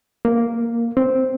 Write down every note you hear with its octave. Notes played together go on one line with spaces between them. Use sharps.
A#3
C4